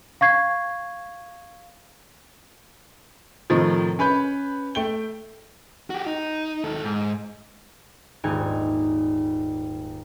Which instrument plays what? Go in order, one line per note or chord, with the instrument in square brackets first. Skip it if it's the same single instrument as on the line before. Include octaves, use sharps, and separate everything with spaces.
[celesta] F5 C#6 G#6 C7
[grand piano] A2 C3 D#3 F3
C#4 B4 B5 G6
A3 G5 G7
[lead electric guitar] F#4 G4
D#4
D#2 A4
G#2
[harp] D#1 G#2 D#4 G#5 G#6